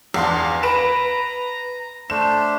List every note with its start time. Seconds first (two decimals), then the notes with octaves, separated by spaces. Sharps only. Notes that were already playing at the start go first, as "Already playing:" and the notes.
0.14 E2 D4 F5 C6
0.34 G#5
0.63 B4 A#5 D7 E7
2.10 A3 D4 C5 E7